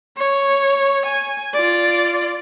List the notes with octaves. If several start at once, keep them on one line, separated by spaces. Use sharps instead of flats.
C#5
G#5
F4 D5